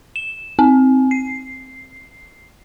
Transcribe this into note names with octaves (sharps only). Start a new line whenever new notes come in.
E7
C4
C7